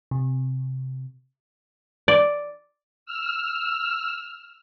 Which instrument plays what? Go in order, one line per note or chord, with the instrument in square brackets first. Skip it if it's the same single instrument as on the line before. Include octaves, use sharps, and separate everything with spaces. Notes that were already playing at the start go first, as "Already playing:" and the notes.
[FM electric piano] C3
[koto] D5
[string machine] E6 F6